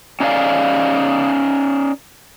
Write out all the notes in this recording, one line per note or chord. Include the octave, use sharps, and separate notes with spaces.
C#4 D#4 G#4 D5 F5